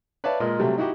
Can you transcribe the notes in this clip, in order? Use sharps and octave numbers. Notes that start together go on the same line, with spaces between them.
B4 C#5 D5 E5 F5 A5
A#2 G#3 A#4 D#5
C3 F#3 G3 A3
D#4 E4 F#4 G4